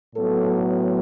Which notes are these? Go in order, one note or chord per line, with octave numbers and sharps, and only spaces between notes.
A2 F#3 B3 A4